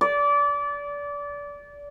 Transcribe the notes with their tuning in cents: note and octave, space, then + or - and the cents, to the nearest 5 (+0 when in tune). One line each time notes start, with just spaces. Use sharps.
D5 -25